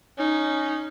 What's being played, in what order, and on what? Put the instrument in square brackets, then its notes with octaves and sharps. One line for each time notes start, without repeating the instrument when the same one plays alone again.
[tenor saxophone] C#4 [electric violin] D#4